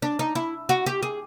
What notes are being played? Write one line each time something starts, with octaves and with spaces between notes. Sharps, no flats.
D4
D#4
E4
F#4
G4
G#4